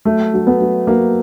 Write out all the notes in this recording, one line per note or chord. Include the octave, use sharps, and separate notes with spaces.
F#3 A3
F#3
B3
F#3
F#3 A#3